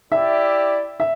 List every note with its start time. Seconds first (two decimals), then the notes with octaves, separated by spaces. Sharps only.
0.11 E4 G4 D5 E5
1.00 E5